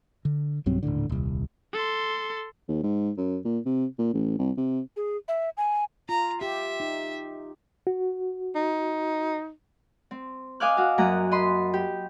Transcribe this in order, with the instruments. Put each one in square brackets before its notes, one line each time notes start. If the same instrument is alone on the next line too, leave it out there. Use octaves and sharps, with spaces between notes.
[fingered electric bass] D3
B1 G2 F#3 C4
D#1 A#1 A2 D3
D#1 C2
[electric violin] A4 C6
[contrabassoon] D#2
G#2
F#2
A#2
C3
A#2
A1
C2
C3
[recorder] G#4
E5
G#5
[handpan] F4 [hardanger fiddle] A#5
[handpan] G4 [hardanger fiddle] E5
[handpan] D#4
[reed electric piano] F#4
[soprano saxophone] D#4
[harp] C4
D#5 F5 G#5 D6 F6 F#6
F#4 F5
F#2 A#3 A#5 D#6 F#6
D#5 B5 C6
G4